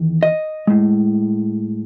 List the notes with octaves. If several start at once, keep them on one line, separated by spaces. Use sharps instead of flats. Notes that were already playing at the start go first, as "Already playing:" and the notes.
Already playing: E2 D#3
D#5
A2 G#3